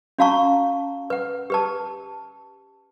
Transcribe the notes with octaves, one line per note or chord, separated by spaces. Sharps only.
C#4 F#4 F5 A5 A#5 C#6
B4 F#5
G4 B4 A5